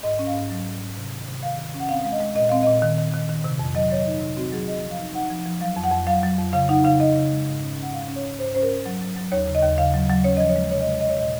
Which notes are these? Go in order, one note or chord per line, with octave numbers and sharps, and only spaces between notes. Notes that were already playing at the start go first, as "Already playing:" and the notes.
G#2 D#5
C#4
F5
G#2
F#3
G#2
G#2
C3
D#3
C3
D#3 F5
D#3
C#4
F#5
C4 F5
G#3 F5
D#5
G#3
A#2 D#5
C4 F5
A#2 D#5
D#3
D#3
D#3
D#3
C3
F2
F#3 D#5
F#3 C#5
D#5
D#4
C3
C4 F#4
F#3 G#4
C4 D#5
F3
F5
D#4
D#4 F#5
F3
F3
F#3 F5
F2
F#5
F2
F#3 F5
F#3
F2
C#3 F5
D#4 F#5
C#3 F5
D#4 D#5
C#3
G#3
G#2
C#4
C#4
F#5
G#2 F5
C#4
C#5
G#2
G#2 C5
C#4 C5
A#4
C#4
F#3
F#3
F#3
D#2 C#5
C#3
D#5
D#2
C#3 F5
F#3
F#3
C#4 C#5
F3 D#5
C#5
G#3
C3 C#5
D#5
G#3 C#5
G#3 D#5
C#5
A#2 D#5